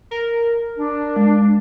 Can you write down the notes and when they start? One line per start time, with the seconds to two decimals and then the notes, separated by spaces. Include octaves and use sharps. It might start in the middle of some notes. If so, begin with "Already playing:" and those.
0.11 A#4
0.76 D4
1.16 G#3